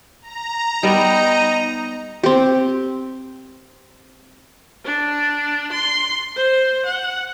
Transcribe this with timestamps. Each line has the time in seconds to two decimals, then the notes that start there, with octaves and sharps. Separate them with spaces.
0.22 A#5
0.83 G3 B3 D#4
2.23 C4 G4
4.85 D4
5.72 C6
6.36 C5
6.85 F#5